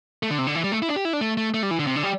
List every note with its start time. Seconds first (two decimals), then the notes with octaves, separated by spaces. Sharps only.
0.23 A3
0.30 D3
0.38 C3
0.47 D3
0.55 E3
0.64 G3
0.72 A3
0.82 E4
0.88 D4
0.96 G4
1.05 E4
1.13 D4
1.21 A3
1.37 A3
1.54 A3
1.63 G3
1.71 E3
1.79 D3
1.87 C3
1.96 D3
2.03 G3